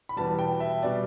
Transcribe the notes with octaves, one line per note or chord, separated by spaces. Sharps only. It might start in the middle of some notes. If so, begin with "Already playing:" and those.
B5
E2 B2 G3 A5
G5
E5
B2 G3 D5